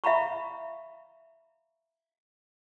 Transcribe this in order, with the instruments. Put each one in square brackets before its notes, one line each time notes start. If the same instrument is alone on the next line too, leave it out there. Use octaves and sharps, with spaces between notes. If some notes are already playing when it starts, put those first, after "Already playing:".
[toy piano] E5 F5 A#5 B5 C#6